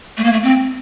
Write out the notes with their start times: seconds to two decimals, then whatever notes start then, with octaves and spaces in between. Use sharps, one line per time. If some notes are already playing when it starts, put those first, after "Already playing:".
0.17 A3
0.24 A#3
0.32 A3
0.43 C4